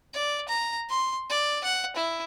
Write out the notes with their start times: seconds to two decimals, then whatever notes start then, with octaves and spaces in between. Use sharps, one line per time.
0.14 D5
0.49 A#5
0.90 C6
1.30 D5
1.64 F#5
1.96 E4